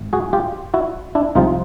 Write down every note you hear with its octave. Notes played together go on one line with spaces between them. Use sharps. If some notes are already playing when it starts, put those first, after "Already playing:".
Already playing: G#1
F#4 G#4
F4 G4
E4 F#4
D4 E4
C2 C3 F3 D#4 F4